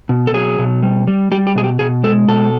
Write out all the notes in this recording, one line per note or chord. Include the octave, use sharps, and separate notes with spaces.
B2
A4
F#3 G#4
B2
G3
G3
G3 G4
G4
B2 G#4
G4
B2 G#4
G#3 A4
B2 A4